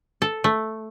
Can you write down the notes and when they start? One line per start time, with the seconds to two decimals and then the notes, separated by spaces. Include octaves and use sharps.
0.22 A4
0.44 A3